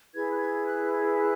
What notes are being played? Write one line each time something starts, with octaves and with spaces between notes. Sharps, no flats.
E4 G#4 B4 G#6
F#6
G#6
F#6
G#6
F#6